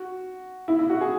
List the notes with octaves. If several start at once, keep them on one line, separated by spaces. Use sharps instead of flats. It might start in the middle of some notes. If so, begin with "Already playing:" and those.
Already playing: F#4
E4
E4
F#4
G#4